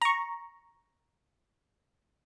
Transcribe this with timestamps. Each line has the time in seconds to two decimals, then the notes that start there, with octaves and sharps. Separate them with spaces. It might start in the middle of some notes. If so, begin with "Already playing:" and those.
0.02 A#5 C#6